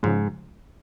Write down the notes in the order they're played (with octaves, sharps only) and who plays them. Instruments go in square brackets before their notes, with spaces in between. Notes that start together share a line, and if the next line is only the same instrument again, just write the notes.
[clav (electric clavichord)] G#2 [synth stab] C#3 F3 G#3